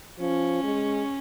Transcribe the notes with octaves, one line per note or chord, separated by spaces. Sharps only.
F3 C#4
G#3